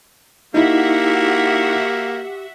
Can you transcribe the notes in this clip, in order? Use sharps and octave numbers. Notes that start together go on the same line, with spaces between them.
A#3 D#4 E4 F#4 G4 E5 F#5